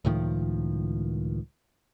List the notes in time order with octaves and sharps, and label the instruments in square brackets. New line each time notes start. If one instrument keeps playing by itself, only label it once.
[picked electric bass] C#2 A2 D#3 F3